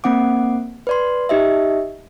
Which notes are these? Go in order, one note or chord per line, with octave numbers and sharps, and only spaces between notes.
A#3 C4 F#5 D6
B4 D5 C6
D#4 G4 D#5 E5